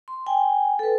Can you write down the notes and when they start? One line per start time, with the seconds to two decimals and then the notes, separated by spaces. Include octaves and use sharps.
0.08 C6
0.26 G5 G#5
0.79 A4 B4